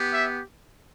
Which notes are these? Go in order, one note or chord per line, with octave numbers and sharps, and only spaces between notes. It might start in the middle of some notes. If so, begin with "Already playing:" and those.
Already playing: B3 G4
E5